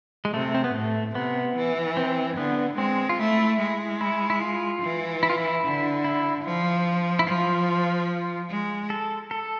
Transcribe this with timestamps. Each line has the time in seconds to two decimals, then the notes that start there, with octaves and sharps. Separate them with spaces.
0.25 G#3
0.33 C3 A3
0.54 C4
0.64 B3
0.74 A2 A3
1.15 C3 B3
1.56 E3
1.97 C4
2.37 D3 B3
2.78 G#3 C4
3.09 F4
3.20 A3 E4
3.60 G#3
4.01 E4
4.30 E4
4.41 F4
4.82 E3
5.23 E4
5.30 F4
5.38 E4
5.64 D3
6.04 E4
6.45 F3
7.19 E4
7.27 F3 F4
8.50 G#3
8.90 A4
9.31 A4